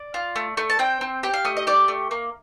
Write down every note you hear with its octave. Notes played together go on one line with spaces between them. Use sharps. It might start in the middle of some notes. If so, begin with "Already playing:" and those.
Already playing: D5
F4
A3
A3
A5
C4 G5
C4
G4 G5
F5
A3 D#5
D#5
G4 D5
A3
A#3